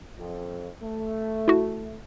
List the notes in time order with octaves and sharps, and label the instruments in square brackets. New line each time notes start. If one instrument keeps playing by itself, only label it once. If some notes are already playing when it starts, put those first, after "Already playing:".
[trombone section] F2
A3
[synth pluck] E4 F#4